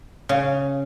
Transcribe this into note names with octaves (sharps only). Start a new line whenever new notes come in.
C#3